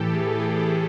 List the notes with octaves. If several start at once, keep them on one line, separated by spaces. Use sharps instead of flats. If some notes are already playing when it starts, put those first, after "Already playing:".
Already playing: A2 E3 G4 A4
G#4
G#4
A4